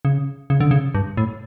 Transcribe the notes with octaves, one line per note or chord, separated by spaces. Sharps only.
C#3
C#3
D3
C#3
G2
A2